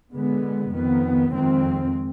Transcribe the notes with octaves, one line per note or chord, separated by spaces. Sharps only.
D3 G#3 B3
F2 D#3 B3
F2 D#3 G#3 C4